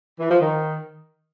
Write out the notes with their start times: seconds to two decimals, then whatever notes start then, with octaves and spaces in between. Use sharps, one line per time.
0.19 E3
0.30 F3
0.40 D#3